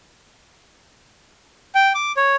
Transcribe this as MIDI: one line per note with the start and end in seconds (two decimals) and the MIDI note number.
1.75 1.93 79
1.95 2.12 86
2.17 2.36 73